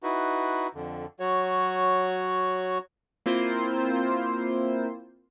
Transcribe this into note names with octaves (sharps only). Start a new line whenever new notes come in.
D#4 E4 F#4 B4
F2 D3
F#3 F#4 C#5
A#3 C4 E4 F4 C5